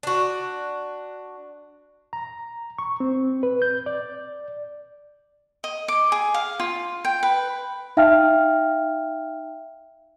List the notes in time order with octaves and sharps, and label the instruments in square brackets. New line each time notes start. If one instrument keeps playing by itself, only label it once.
[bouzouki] D4 F#4
[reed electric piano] A#5
C#6
C4
B4
G6
D5
[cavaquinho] D#5
D6
G#4
F5
F4
G5
B4
[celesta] D#4 E5 F5 G5 A5 F6